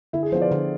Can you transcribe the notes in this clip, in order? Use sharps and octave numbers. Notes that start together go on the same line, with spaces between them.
D3 E4
G#4
F3 B3 F4 C5
D5
D3